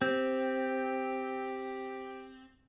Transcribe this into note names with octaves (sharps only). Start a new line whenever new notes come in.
C4 G4